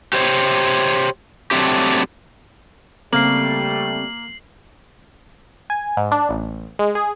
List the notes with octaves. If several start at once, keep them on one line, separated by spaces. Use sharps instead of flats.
G4 C5 C#5
F#3 A3 C4 D4 G4
C#3 G3 A3 A#3 C4 C7 F#7
G#5
G#2
D4
A1
G#3
G#4